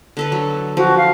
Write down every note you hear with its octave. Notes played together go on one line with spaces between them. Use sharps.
D3 A4 B4
F#3
F3 F#4
F5